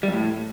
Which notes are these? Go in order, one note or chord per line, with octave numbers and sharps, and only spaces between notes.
G3
F2
A2